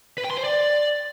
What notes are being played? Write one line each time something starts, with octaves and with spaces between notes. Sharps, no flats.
B4
G5
C6
C5
D5